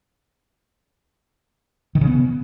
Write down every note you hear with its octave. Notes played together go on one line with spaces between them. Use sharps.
D#3
C#3
B3